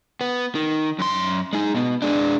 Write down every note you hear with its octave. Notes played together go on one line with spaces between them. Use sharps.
B3
D#3
F#2 C6
G#3 D#4
B2 B3
G#3 D4